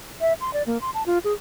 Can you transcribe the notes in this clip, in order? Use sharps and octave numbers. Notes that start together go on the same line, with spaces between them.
E5
C6
D5
A#3
C6
A5
F4
G#4